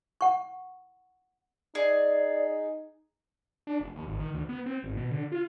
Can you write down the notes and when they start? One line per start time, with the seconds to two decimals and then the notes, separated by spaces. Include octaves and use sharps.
0.21 F#5 C#6
1.75 D#4 G#4 D5
3.67 D4
3.80 F1
3.96 D#2
4.07 G#1
4.20 D#3
4.34 D2
4.49 B3
4.66 C4
4.83 G#1
4.97 B2
5.11 D3
5.32 F4